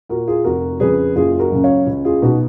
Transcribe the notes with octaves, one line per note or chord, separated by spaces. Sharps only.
A#2 F#4 A#4
F4 G#4
F1 F#4 A#4
F2 C#3 G#4 B4
F#1 F4 G#4
F#4 A#4
F#2 C#3
C#5 F5
C#2
F4 G#4
B2 D#4 F#4